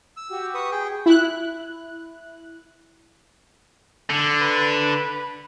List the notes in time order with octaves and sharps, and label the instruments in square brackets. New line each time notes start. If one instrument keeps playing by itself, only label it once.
[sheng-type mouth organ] E6
[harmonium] F#4 G4
[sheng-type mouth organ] B4 C#6 D#6
G#4 G5
[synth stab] E4 F#6
[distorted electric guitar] D3
[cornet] B4